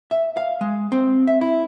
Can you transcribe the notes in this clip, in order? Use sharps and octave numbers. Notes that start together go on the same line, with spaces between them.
E5
F5
G#3
C4
E5
E4